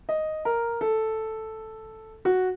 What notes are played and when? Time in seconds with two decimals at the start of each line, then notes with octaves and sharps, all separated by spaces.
0.09 D#5
0.45 A#4
0.81 A4
2.25 F#4